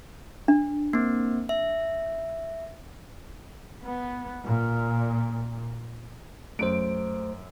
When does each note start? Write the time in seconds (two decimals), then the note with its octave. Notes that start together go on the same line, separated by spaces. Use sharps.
0.48 D4
0.93 A#3 C4
1.49 E5
3.82 B3
4.45 A#2
6.59 F#2 A3 C5 D7